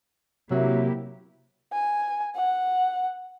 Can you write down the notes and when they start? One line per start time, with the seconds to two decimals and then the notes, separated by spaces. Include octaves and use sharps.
0.51 C3 F#3 A#3 E4 G4 E5
1.73 G#5
2.36 F#5